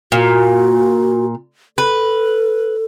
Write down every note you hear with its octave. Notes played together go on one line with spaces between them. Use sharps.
A#2 F#4
A4 B4